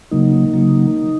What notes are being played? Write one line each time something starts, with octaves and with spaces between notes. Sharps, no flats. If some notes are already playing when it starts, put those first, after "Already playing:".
C#3 F#3 A#3 D#4
C#3 F#3 A#3